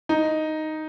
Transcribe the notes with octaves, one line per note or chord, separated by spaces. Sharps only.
D#4